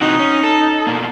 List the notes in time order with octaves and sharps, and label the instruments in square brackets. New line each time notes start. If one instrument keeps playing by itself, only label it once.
[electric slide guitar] C3 E3 F#4 [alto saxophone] D#4
[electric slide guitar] C#4
A4
B2 A#3